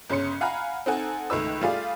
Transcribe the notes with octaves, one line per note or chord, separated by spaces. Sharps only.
G1 C#3 C#4 C6 C#7
F5 F#5 G#5 A#5 B5 F6
C4 D#4 A4 F#5 G#5
C#2 D#3 A3 B4 E6
G3 A3 F4 G#4 D5 F5